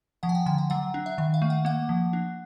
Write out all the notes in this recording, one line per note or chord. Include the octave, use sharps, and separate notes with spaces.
F3 F#5
G#5
G5
D3 G5
F#5
F#3 F#5
D4
E5
D#3 E5
F5
A3
F#5
A#3 F#5
F3
D4